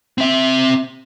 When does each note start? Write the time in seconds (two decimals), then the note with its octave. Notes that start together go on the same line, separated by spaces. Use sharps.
0.18 C4 E5